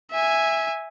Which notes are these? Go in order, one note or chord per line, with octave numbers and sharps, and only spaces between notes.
E5 G#5